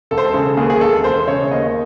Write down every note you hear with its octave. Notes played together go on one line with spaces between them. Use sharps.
E1 A4
C5
A4
C#3
D#2 G#4
G#4
E1 A4
E1 C5
C#3 C#5
D#2 D#5